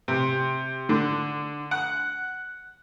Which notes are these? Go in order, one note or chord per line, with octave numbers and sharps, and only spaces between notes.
C3
D3
F#5